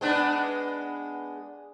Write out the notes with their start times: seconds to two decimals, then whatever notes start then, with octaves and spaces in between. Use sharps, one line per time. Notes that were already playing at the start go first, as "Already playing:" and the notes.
0.01 G#3 B3 D4